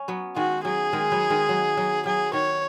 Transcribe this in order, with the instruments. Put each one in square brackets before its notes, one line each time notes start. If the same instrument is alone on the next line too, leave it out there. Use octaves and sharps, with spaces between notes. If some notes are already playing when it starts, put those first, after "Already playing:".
Already playing: [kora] C#4
F#3 B3
[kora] D#3 G#3 [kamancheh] F#4
[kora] F#3 [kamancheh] G#4
[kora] D#3 G#3
F#3 B3
D#3 G#3
F#3
F#3
[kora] F#3 [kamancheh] G#4
[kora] D#3 [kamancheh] C#5